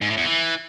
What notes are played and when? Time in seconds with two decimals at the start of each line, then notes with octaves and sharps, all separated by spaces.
0.02 G#2
0.09 A2
0.17 E2
0.25 E3